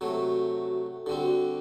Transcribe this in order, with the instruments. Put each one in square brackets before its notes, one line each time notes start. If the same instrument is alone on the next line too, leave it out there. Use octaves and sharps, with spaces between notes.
[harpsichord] C3 F#3 A3 [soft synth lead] F#4
[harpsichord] D3 G3 C4 [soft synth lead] F#4